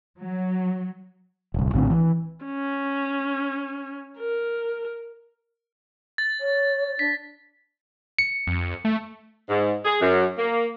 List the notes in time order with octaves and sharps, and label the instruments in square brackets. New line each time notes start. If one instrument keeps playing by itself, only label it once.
[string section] F#3
[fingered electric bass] D1 C2
A#1 A2 D3 C4
E3
[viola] C#4
A#4
[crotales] A6
[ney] C#5
[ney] D4 [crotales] B6
[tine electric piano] C#7
[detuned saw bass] F2
A3
[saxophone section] G#2
G#4
F#2
A#3